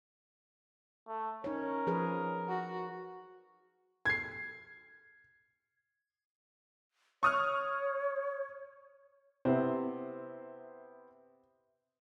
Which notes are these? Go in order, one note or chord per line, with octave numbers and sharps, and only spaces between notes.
A3
C#4 D#4 A#4 C#5
F3 G#4 B4
F#4
G#6 C7
C#5 C#6 D#6 F6
C3 B3 E4 C5